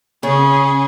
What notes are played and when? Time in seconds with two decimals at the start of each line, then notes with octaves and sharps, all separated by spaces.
0.23 C#3 C#4 G#4